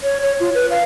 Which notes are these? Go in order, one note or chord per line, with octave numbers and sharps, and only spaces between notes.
C#5
C#5
F4
B4
F5